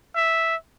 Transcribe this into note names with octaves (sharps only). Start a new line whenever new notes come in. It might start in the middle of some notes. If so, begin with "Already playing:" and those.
E5